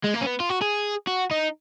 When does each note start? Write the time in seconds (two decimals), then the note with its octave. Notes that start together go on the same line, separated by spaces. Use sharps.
0.04 G#3
0.15 A#3
0.21 C#4
0.27 B3
0.40 F4
0.49 F#4
0.61 G#4
1.08 F#4
1.31 D#4